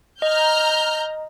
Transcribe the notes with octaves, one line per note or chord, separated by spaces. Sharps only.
D#5 A#5 F6 G6